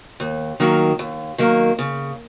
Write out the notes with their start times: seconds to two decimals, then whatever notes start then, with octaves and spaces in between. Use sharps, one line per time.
0.20 D#2
0.60 D#3 F#3 A#3
0.99 D#2
1.38 D#3 F#3 A#3
1.79 C#3